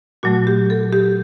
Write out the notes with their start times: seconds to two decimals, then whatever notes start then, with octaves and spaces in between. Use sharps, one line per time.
0.23 A#2 F#3 A3 F#4
0.47 G4
0.70 A4
0.93 G4